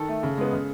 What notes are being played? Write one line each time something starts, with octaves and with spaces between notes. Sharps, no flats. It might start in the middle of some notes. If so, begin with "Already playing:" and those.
Already playing: D#3 A4
A3
C#3
G#3 B3
C#3